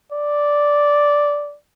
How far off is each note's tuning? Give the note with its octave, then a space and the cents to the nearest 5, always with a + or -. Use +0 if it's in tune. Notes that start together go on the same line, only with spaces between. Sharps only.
D5 -5